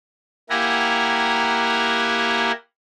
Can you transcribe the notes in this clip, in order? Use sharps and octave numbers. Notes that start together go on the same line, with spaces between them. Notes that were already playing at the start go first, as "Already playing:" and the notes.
A#3 E4 G4 F#5 G#5 A#5